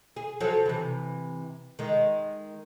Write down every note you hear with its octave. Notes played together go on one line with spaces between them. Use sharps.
G#4
F3 F#3 A4
C3 E3
D#3 G#3